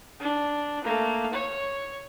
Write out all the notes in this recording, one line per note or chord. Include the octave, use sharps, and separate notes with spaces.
D4
A3 A#3
C#5